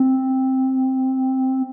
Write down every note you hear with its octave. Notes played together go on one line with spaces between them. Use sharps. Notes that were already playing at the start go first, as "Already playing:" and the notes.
Already playing: C4